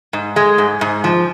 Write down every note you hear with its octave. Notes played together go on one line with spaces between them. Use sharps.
G#2
G#3
G#2
G#2
F3